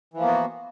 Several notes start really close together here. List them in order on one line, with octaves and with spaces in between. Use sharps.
E3 F3 A#3 B3 F#4